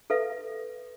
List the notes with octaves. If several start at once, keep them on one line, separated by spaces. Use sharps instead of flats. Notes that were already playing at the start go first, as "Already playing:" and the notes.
A4 B4 E5 F5